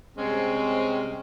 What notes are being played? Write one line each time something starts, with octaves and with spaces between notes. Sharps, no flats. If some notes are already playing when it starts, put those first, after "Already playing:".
C3 G3 G#3 C4 C#4